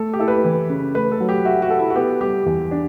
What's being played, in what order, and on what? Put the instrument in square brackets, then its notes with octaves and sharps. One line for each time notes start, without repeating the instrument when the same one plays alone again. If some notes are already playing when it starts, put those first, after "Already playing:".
Already playing: [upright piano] A3 [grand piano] A4
[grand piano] G4
[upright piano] E4 [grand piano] A4
[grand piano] B4
[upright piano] E3
C#3
[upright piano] A3 [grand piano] B4
[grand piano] A4
[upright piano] F#3
[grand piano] G4
[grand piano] F#4 [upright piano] E5
[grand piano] F#4
[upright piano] A4
[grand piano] E4
F#4
[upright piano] B3 [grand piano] G4
[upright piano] G3 [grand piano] G4
[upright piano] E2
D4